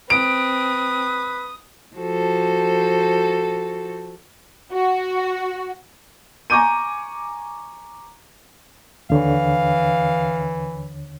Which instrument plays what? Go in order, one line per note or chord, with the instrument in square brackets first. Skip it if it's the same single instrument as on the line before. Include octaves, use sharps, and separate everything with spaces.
[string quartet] C4 [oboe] B4 [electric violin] D#6 [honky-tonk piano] D7
[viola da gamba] F3 F#4 A4
[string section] F#4
[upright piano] G#5 A#5 C#6 D6 G6 D#7
[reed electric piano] D#2 D3 C#5 [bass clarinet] E3 [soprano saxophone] F5